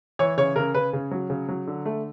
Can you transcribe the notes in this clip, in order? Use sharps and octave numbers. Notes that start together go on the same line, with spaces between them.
E3 C#5
C#3 C#5
C#3 A#4
C#3 B4
C#3
F#3
C#3
F#3
D3
A3